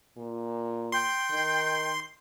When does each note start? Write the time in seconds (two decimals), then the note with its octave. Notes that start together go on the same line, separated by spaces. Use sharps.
0.18 A#2
0.92 G5 C6
1.31 D#3